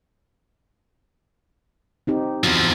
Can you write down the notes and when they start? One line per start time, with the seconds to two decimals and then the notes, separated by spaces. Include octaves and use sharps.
2.07 C4 D#4 G4
2.44 E2 F3 F#4